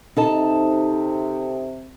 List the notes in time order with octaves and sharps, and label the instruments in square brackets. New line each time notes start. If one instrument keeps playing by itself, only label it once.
[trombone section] C3 [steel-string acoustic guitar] D#4 A4 A5